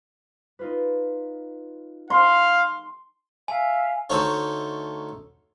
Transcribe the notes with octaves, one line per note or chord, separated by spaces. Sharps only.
D#4 F4 B4
F5 C6
E5 F5 G#5
D2 A3 D#4 C5 C#5